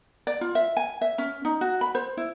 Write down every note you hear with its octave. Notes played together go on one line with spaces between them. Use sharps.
D5
F4
E5
G#5
E5
C#4
D#4
F#4
B5
C5
E4